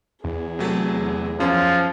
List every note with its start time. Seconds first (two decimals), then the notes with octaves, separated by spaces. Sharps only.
0.24 E2 G#4
0.59 C3 F#3 A3
1.40 F#2 F3 C#4